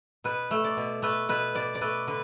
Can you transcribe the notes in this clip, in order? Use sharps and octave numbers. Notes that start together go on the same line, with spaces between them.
B2 B4
A3
D5
B2
A3 B4
B2 B4
B2 D5
D5
A3 B4
D3 B4